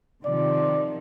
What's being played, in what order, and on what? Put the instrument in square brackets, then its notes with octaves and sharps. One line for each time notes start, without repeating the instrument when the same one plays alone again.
[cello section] C3 D#3 F3 [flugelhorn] D5